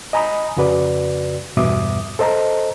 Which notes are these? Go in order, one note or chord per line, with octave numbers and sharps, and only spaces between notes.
D#5 G#5 A#5 B5 D#6
F2 C#3 F#4 B4 D5
E2 G2 B2 E5 D6 D#6
A4 C5 D#5 A5 A#5